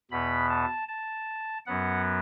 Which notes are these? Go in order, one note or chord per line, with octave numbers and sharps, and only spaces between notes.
E2 B2 B3 B5
A5
A5
F#2 F#3 B3 F#5